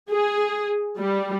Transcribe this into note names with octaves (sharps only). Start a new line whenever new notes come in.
G#4
G3